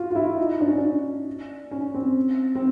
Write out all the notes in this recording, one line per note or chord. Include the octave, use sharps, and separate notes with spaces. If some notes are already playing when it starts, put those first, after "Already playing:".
Already playing: F4 F#4
F4
E4
D#4
D4
C#4
D4
C#4
C4
C4